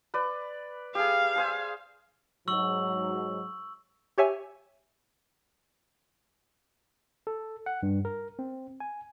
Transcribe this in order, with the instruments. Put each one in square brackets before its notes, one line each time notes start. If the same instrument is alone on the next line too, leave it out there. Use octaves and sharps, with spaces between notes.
[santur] B4 D5
[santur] G4 G#4 [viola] F5
[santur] G#4 C5 G#5
[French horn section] G#2 F#3 [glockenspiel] C#6 E6 F#7
[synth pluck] G4 C#5 E5 G#5
[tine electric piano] A4
F#5
G2
A#4
C4
G#5